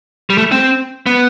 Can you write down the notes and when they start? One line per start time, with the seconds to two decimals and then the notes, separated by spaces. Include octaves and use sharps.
0.30 G3
0.38 A3
0.52 C4
1.06 B3